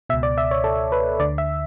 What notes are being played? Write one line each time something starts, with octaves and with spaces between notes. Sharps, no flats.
C#2 B2 E5
D5
E5
C#5
A4
B4
D2 D3 D5
E5